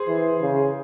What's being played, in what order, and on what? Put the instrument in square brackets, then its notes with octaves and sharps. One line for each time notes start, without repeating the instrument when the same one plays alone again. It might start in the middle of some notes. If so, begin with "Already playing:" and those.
Already playing: [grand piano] G#4 C5
[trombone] E3
C#3